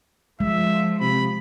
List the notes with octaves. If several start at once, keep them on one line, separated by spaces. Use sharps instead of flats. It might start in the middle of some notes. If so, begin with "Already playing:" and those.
F3 G#3 E5
C3 B5